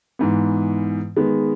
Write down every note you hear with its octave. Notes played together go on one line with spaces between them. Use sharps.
G#2 E3 B3
D#3 G#3 B3